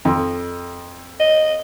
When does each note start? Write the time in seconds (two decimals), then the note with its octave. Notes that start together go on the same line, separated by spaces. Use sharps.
0.05 F2
1.20 D#5